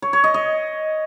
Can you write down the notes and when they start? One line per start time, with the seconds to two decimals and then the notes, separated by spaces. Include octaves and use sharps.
0.02 C#5
0.13 C#5
0.24 D#5
0.34 D#5